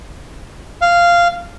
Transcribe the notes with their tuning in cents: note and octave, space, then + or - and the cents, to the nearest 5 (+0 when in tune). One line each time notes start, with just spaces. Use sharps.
F5 -10